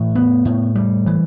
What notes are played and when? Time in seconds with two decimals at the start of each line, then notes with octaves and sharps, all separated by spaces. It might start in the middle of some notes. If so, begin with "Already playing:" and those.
Already playing: A2 E3
0.15 B3
0.45 A2
0.75 G3
1.06 E3